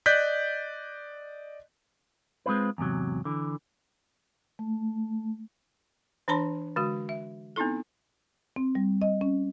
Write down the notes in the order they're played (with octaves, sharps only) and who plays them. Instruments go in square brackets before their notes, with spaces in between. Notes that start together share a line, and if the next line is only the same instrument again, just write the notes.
[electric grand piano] D5 D#5 F#6 G6 B6
[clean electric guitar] G#3 A#3 C4 F4 B4
E2 G#2 C3 F#3
D3 E3
[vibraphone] A3
[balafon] E3 D4 C#5 A5 B5 C6
D3 G#3 F#4
E5
B3 C4 D#4 E4 A4
[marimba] C4
G3
D#5
C#4